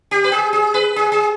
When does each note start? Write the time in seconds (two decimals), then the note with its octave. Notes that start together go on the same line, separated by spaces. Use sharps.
0.11 G4
0.24 B4
0.32 G#4
0.53 G#4
0.74 B4
0.96 G#4
1.12 G#4